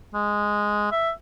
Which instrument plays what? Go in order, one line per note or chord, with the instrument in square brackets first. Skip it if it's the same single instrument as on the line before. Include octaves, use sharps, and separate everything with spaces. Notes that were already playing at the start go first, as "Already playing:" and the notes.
[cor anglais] G#3
E5